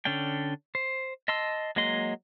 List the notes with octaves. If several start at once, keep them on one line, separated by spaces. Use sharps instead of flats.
D3 C#4 D4 G5
C5
D#5 A5 C6 E6
F#3 G#3 A#3 D#5 C6